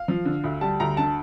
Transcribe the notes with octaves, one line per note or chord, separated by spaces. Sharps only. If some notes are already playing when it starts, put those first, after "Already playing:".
Already playing: F5
F3
D3
D2
G3 A5
D2 A#5
D3 A5